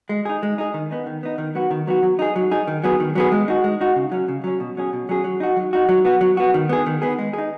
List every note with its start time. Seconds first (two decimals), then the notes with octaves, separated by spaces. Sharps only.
0.09 G#3
0.25 D#4 G#4
0.43 G#3
0.58 D#4 G#4
0.74 D#3
0.91 B3 D#4
1.06 D#3
1.23 B3 D#4
1.38 D#3
1.55 F#3 B3 F#4
1.71 D#3
1.87 F#3 B3 F#4
2.03 F#3
2.19 D#4 G#4
2.36 F#3
2.51 D#4 G#4
2.67 D#3
2.84 F#3 B3 G#4
3.00 D#3
3.15 F#3 B3 G#4
3.32 G#3
3.48 D#4 F#4
3.64 G#3
3.81 D#4 F#4
3.96 C#3
4.12 F#3 C#4
4.28 C#3
4.44 F#3 C#4
4.60 B2
4.77 F#3 C#4 G#4
4.93 B2
5.09 F#3 C#4 G#4
5.24 F#3
5.40 D#4 F#4
5.56 F#3
5.73 D#4 F#4
5.89 F#3
6.05 B3 F#4
6.21 F#3
6.37 B3 F#4
6.54 D#3
6.69 B3 G#4
6.86 D#3
7.02 B3 G#4
7.19 G#3
7.33 D#4 G#4